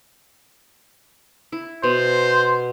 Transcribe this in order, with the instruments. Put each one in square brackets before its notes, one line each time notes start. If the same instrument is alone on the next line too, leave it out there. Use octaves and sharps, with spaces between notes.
[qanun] E4
[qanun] B2 [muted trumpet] C5